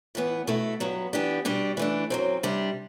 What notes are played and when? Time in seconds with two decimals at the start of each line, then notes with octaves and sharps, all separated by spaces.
0.15 A2 E3 B3
0.47 B2 A3 E4 A4
0.80 G2 F#3 B3
1.13 E3 B3 D4 G4
1.45 B2 G3 D4 G4
1.77 E3 A3 D4
2.10 F#2 F#3 C4
2.43 C3 G3 D4